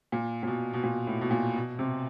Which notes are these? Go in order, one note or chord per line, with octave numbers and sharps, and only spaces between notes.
A#2
A#2
B2
B2
A#2
A2
B2
A#2
B2
C3